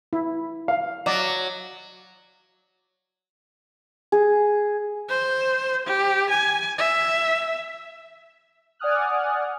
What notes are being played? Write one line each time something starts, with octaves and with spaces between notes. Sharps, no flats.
E4
F5
F#3 D5 D#5 D6
G#4
C5
G4
G#5
E5
D5 F#5 G#5 D#6 F6 F#6